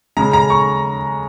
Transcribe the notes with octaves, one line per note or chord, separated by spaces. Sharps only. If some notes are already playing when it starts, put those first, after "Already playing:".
C#3 G#3 A#5
A#5
C#6